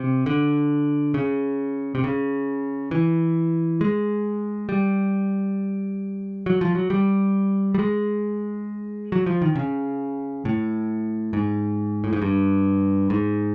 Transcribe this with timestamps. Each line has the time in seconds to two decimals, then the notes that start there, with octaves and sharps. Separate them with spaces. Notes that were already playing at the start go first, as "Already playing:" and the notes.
Already playing: C3
0.26 D3
1.14 C#3
1.95 C3
2.04 C#3
2.91 E3
3.81 G#3
4.69 G3
6.46 F#3
6.61 F3
6.75 F#3
6.90 G3
7.74 G3
7.79 G#3
9.12 F#3
9.26 F3
9.42 D#3
9.55 C#3
10.45 A2
11.33 G#2
12.04 A2
12.13 G#2
12.22 G2
13.10 G#2